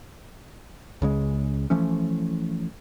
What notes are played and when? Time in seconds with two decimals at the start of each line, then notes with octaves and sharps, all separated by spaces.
1.02 C#2 C#3 G#3
1.70 E3 F3 A3 C#4